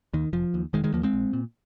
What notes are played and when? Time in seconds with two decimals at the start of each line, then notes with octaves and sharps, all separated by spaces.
0.13 D#2 D#3
0.33 F1 F3
0.54 D#2
0.73 F1 D#3 G#3
0.84 D#3 G#3
0.93 D#2 F3 A#3
1.03 G#3 C4
1.13 A#1
1.33 A#2